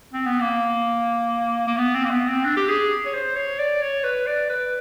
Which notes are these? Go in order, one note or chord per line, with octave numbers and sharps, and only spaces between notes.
C4
B3
A#3
A#3
B3
C4
A#3
B3
C4
D4
G4
G#4
C#5
C5
C#5
D5
C#5
B4
D5
B4